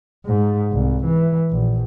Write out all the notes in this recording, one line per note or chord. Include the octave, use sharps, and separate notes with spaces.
G#2
C2
E3
A#1